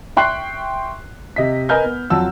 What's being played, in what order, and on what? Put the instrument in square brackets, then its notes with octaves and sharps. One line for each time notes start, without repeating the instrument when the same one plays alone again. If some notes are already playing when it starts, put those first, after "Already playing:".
[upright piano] E5 G5 C6 C#6 F#6 C7
C3 D#5 E5 B6
A#4 B4 D#5 G#5 F6 G6
B3
F2 F#3 F4 F#4 A5 E6